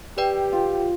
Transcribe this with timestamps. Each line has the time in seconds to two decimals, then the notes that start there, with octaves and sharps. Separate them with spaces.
0.18 G4 B4 D5 G5
0.52 F4